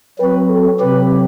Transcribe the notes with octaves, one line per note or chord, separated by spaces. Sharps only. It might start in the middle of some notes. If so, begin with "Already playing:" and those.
F#3 C4 F#4 B4
A4
C3 F#3 C4 G4 B4